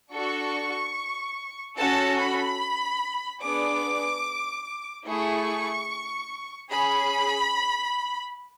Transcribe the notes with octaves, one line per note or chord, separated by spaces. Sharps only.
D4 F#4 A4 C#6
C#4 F#4 A4 A5
B5
B3 D4 G#4 D6
A3 E4 G#4 C#6
C#4 G#4 B5